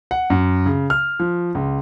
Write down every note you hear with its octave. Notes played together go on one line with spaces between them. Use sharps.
F#5
F#2
C#3
F6
F3
C#2